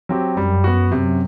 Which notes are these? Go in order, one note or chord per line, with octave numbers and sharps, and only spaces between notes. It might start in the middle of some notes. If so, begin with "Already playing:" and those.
F#3 C4 G4
F#2 G3
B3 F#4
F#2 C3